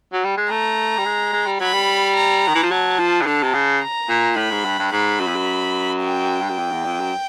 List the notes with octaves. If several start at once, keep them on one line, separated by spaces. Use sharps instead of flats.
F#3
G3
G#3
A3 A#5
G3
G#3
G#3
G3
F#3 B5
G3
A#5
D#3
E3
F3
F#3 A5
F3
C#3
D3 A5
C3
C#3
A#5
A#2
A2 B5
G#2
G2
G2
G#2 B5
F#2
F2
F#2
G5
G2
F#2
F2
E2
F2
F#2